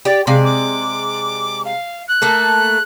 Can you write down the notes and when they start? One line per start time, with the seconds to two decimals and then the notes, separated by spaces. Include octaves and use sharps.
0.05 G4 D5
0.27 C3 G#3 D5 F5
0.44 D6
1.65 F5
2.07 F#6
2.22 A3 A#3 A4